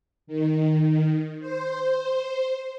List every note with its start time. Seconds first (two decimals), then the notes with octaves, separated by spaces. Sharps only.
0.27 D#3
1.40 C5